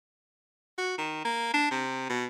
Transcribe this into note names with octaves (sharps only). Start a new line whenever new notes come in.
F#4
D#3
A#3
D4
C3
B2